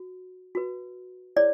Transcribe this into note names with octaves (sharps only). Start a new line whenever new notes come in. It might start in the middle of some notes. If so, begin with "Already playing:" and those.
Already playing: F#4
F#4 B4
E4 G#4 C#5 D5